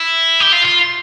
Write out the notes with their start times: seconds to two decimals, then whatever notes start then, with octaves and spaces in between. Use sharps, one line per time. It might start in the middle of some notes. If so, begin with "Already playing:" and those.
Already playing: E4
0.40 G4
0.52 F4
0.65 F4